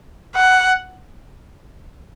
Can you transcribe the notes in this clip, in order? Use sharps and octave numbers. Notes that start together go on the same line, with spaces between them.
F#5